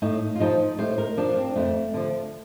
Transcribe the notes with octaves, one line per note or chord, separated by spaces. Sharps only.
A2 D#4
F4
F3 D#4
A2 C5
A#4
F3 D4
C4
F2 A3
D3 F3